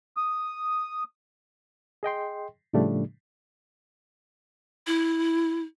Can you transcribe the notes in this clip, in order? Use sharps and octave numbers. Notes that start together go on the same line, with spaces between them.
D#6
G#4 D#5 G5 C6
A2 C#3 F3 G3 A3 D4
E4